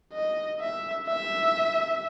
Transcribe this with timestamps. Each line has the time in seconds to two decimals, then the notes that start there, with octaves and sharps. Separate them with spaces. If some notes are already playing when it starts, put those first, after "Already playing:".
0.13 D#5
0.60 E5
1.07 E5